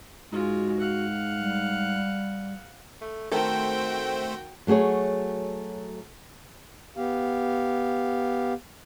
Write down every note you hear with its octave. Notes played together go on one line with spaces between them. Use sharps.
G#2 G#3 F4 F#4
F5 F#5
G3
A3
D#3 A3 C4 F#4 A4 C5 G5
F#3 A3 F#4 G#4 C#5
B3 G4 F5